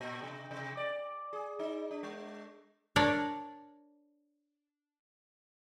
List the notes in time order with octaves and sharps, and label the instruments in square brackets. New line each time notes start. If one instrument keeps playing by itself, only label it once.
[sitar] A#2
C3
C3
D5
G#4
D#4
D4
G#3
[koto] D4 A#4 C#5 D5